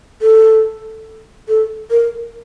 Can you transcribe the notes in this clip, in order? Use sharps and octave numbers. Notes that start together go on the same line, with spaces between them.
A4
A4
A#4